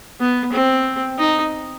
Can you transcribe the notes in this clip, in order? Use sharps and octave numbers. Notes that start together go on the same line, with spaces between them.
B3
C4
D#4